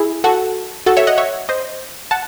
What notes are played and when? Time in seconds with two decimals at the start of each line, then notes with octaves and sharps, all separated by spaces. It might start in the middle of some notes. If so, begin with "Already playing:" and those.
Already playing: E4 G#4
0.24 F#4 A4
0.86 F#4 A4
0.97 C#5 E5
1.07 D#5 F#5
1.18 C#5 E5
1.49 C5 D#5
2.11 F#5 A5